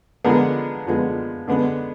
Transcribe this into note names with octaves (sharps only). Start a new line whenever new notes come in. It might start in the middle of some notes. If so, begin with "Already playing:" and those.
D3 F3 G#3 B3 A#4
D3 F3 G#3 B3
D3 G#3 B3